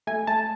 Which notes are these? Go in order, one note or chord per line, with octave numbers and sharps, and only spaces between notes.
A3 G#5
A3 A5